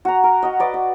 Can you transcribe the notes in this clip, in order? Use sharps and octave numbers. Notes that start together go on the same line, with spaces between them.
F#4 A#5
A#4
F#4 D#5
B4 D5 D#5
D5